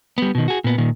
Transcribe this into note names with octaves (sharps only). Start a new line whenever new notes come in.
G3 B3
B2 D#3
F#4 G#4
A#2 B3
A#2 D#3